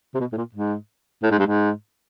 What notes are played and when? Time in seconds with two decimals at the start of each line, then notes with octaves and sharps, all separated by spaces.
0.15 C3
0.20 B2
0.32 A2
0.37 A#2
0.55 G#2
1.23 A2
1.31 G#2
1.39 G2
1.47 G#2